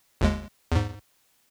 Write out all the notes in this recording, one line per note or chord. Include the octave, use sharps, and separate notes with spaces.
G1 D#2 G#3
E2 G#2